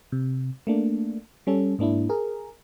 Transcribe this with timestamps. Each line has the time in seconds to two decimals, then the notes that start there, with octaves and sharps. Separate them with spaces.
0.12 C3
0.67 A3 A#3 D4
1.47 G3 C#4 A4
1.79 G#2 A#3 D4 E4
2.09 G#4 A#4